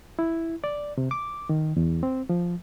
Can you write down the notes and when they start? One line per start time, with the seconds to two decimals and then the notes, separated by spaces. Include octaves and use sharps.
0.19 E4
0.64 D5
0.98 C3
1.11 D6
1.49 D#3
1.77 E2
2.03 C4
2.29 F3